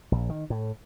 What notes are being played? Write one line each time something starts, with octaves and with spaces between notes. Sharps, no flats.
A#1
D#3
A2